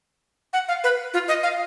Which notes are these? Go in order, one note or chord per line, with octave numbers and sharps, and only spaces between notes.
F#5
F5
B4
F4
D#5
F5